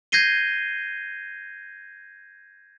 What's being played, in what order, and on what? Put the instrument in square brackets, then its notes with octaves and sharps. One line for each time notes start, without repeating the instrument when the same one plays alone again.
[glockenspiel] G6 G#6 A#6 C7 D#7 G7